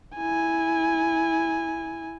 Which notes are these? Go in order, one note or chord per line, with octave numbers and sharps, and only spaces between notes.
E4 G#5